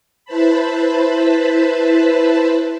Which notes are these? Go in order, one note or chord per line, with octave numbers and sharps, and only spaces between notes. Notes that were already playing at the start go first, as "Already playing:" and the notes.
E4 B4 C5 A5 B5